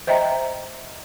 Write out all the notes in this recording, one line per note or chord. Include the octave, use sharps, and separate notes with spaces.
C5 D#5 E5 G5 A#5